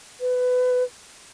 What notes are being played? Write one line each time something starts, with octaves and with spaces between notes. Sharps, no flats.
B4